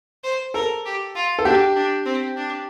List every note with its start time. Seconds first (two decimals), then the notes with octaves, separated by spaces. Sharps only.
0.24 C5
0.54 A4 A#4
0.85 G4
1.15 F4
1.39 A4
1.45 D4 G4
1.76 D4
2.06 C4
2.37 D4